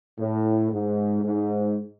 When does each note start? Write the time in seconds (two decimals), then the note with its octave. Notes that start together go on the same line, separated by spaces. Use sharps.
0.19 A2
0.71 G#2
1.23 G#2